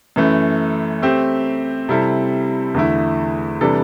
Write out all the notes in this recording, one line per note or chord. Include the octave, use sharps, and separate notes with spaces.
F#2 E3 A3
A3 C4 G4
C3 G3 C4 E4 A4
E2 D3 A3 E4
C3 E3 G3 D4 A4